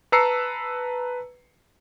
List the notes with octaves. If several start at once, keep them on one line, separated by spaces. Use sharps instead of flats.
B4 A5 A#5 E6 C7 C#7